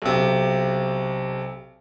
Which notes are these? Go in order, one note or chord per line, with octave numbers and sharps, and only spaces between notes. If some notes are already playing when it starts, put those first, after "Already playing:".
B1 C3